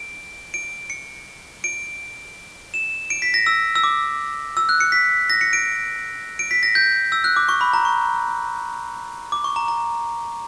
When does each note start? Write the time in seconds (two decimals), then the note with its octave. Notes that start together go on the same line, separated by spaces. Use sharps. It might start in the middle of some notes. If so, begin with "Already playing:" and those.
Already playing: D7
0.54 D7
0.90 C#7
1.64 D7
2.74 E7
3.10 D7
3.22 B6
3.34 A#6
3.47 E6
3.75 E6
3.84 D6
4.57 E6
4.69 F#6
4.80 C#7
4.92 B6
5.30 A#6
5.41 C#7
5.53 D7
6.39 D7
6.51 B6
6.63 A#6
6.75 G6
7.12 E6
7.24 F#6
7.36 D6
7.49 C#6
7.61 B5
7.73 A#5
7.85 C#6
9.32 D6
9.44 C#6
9.56 A#5
9.68 A#5